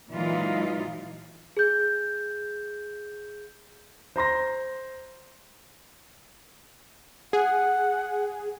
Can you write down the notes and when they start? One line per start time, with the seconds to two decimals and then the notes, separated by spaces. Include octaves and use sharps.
0.11 A#2 E3 F#3 G#3 D#4 F4
1.57 G#4 G6
4.16 C5 A#5 C6 A#6
7.33 G#4 F#5